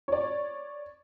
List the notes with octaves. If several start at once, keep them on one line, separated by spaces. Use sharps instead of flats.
C#5 D5